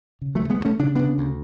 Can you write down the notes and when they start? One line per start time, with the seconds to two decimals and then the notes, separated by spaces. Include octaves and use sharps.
0.21 C#3
0.35 F#3 A3
0.41 D2
0.50 G#3 B3
0.60 D2
0.65 A3 C#4
0.79 C#3 D4
0.95 C#3 B3 D4
1.18 D2